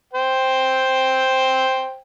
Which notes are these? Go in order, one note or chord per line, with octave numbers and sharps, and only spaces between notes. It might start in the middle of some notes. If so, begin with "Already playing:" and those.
C5 G5